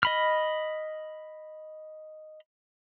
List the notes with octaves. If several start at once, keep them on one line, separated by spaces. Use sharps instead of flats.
D#5 B5 F6